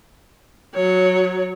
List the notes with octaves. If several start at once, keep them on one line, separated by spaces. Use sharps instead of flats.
F#3 C#5